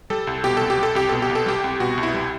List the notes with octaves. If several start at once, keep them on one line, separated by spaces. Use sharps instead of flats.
G3 A4
C2
B2 G4
C2 A4
G4
G3
A4
C2 G4
B2 A4
G4
C2
A4
G3 G4
C2
B2 F#4
C2
E4
G3